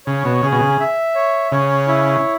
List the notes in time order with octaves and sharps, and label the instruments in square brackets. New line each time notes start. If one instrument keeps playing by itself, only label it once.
[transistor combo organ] C#3 [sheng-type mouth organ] C#5
[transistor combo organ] B2
[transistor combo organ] C#3 [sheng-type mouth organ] G#4
[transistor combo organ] B2
C#3
[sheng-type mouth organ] E5
C#5
[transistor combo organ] C#3 [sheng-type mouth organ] C#5
[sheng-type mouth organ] E4